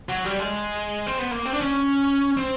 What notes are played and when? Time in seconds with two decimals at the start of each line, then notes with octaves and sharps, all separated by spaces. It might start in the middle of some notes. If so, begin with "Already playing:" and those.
0.09 F#3
0.24 G3
0.39 G#3
1.07 C4
1.19 B3
1.31 A#3
1.45 C4
1.53 D4
1.61 C#4
2.37 C4